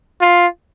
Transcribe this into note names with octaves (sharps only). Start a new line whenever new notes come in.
F4